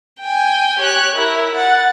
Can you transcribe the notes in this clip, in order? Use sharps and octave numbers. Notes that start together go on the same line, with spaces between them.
G5 G#5
G4 C#5 F#6
E4 A#4
F#5 A6